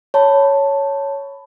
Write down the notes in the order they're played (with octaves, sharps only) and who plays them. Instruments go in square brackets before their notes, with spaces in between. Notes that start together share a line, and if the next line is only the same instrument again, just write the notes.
[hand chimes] C#5 A5 B5